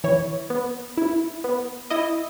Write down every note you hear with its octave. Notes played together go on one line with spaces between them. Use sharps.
E3 C#5
B3
E4
B3
E4 D#5